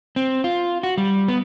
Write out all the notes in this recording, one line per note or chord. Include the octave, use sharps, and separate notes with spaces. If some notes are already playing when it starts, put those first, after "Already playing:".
C4
F4
F#4
G3
B3